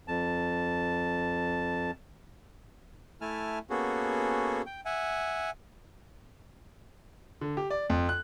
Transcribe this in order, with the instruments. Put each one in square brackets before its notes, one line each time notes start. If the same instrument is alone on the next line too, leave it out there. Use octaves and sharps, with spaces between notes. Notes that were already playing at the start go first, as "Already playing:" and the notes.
[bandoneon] F2 A5
[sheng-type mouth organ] A3 E4 G#5 A5 F6
A#3 B3 C#4 F#4 G#4 A4
G5
E5 F#5 G#5
[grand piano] D3
G4
D5
F2
F#6